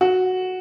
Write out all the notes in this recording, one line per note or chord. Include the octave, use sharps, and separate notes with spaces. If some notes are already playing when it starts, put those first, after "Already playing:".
F#4